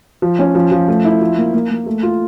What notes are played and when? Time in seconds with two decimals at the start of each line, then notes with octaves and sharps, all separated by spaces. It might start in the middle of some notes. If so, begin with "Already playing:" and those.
0.22 F3
0.39 C#4
0.55 F3
0.71 F3
0.88 A3
1.05 E4
1.21 F3
1.37 A#3
1.53 A#3
1.70 A#3
1.86 A3
2.03 F4